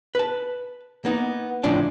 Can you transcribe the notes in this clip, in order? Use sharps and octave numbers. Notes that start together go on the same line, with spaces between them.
B4 A5
A#3 B3 D#4
C#2 A2 F3 C#4 D4 A5